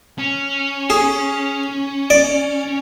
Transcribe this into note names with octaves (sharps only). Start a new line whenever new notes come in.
C#4
G#4
D5